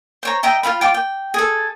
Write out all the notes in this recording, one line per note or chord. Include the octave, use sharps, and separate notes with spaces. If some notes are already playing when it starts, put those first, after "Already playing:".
C5 C#5 A#5
D#5 E5 G5 A#5
F4 G#4 F5 B5
F4 G5 D6
G5
G#4 A4